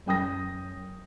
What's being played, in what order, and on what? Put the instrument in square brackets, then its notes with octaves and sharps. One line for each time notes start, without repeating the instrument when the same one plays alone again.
[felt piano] F#2 G5 D#6 A#6